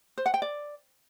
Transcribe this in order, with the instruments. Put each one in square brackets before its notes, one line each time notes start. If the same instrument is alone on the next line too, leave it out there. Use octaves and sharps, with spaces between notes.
[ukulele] C5
F#5
G5
D5